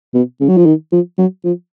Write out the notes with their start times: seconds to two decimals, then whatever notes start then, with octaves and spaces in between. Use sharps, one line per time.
0.14 B2
0.40 C#3
0.48 F#3
0.57 F3
0.66 D#3
0.92 F3
1.18 F#3
1.44 F3